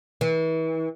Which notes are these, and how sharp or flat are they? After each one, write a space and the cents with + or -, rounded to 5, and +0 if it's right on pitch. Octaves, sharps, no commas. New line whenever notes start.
E3 -35